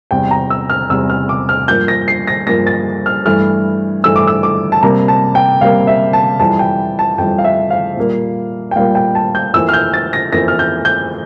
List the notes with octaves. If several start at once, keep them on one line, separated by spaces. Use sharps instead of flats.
E2 C3 G3 G5
A#5
E6
F6
E2 C3 G3 E6
F6
D6
F6
G2 F3 A#3 G6
A#6
C7
A#6
G2 F3 A#3 A#6
A6
F6
G2 E3 A3 F6
G2 E3 A3 E6
D6
E6
D6
A5
C3 G3 A#3 A#5
A5
G5
C3 G3 A#3 F5
E5
A5
F2 E3 G3 A5
G5
A5
F2 E3 G3 G5
F5
E5
F5
A#2 G3 A#3
G5
A#2 G3 A#3 F5
G5
A5
G6
F2 E3 A#3 E6
F6
G6
A6
A#6
F2 E3 A#3 A#6
F6
G6
G6